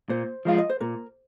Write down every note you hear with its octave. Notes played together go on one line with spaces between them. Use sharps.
A#2 C5
F3 G#3 F4 F5
D#5
C5
A#2 A#4